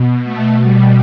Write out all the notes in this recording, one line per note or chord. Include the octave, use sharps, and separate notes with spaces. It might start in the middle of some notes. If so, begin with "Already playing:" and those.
Already playing: B2
A3
G3